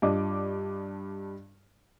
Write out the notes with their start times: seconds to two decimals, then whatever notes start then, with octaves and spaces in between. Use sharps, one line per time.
0.02 G2 D4 F4 D#5 D6